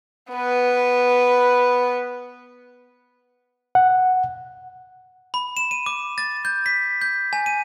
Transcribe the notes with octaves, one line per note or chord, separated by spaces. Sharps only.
B3 B4
F#5
B5
E7
D#7
D6
A6
G6
B6
G6
G#5
D#7